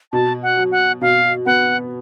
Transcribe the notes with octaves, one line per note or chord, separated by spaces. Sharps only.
B2 A5
F#5
F#3
F#5
B2 F5
B3 F#5